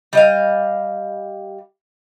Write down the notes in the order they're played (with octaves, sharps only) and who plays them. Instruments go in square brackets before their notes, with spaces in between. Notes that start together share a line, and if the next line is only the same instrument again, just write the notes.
[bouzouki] G3 D#5 F5